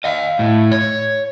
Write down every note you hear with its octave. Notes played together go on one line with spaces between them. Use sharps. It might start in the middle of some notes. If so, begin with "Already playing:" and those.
D#5 F5
A2
C#5